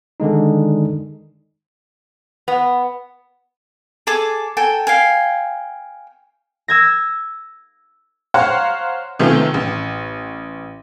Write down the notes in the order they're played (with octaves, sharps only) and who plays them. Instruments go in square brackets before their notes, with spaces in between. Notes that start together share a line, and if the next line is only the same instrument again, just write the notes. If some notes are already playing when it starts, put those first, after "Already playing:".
[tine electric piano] D3 D#3 G#3 D#4
[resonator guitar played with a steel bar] B3
[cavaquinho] G#4 A4 G#5 D6
A4 G5 G#5
F5 G5 G#5
[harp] E6 G#6 A#6
[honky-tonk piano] C5 C#5 F5 F#5 A#5
C3 D#3 A3 B3 C#4 F4
A1